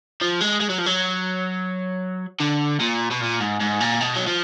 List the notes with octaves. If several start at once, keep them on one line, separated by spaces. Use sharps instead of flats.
F3
G#3
G#3
F#3
F3
F#3
D3
A#2
B2
A#2
G#2
G#2
A#2
B2
F#3
F3